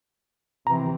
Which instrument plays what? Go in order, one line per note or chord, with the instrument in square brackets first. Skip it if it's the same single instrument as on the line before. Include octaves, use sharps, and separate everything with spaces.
[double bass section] C3 E3 C4 [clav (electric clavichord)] A#5